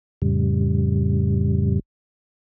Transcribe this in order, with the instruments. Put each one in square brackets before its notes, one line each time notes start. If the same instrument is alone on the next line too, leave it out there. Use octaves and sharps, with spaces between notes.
[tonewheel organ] F2 A2 C#3 G3